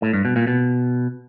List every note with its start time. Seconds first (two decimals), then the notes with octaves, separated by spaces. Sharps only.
0.02 A2
0.13 G2
0.25 B2
0.36 A#2
0.47 B2